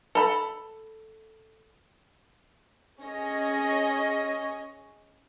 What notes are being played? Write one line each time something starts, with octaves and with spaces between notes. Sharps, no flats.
A4 A#5 B5
C#4 G#4 C#5 D#5